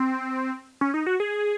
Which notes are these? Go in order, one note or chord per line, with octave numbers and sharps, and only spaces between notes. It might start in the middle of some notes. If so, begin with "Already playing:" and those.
Already playing: C4
C#4
D#4
F#4
G#4